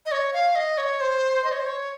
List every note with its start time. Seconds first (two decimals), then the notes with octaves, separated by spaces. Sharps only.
0.06 D#5
0.12 C#5
0.33 F5
0.55 D#5
0.78 C#5
1.01 C5
1.44 D#5
1.52 C#5
1.59 C5
1.66 C#5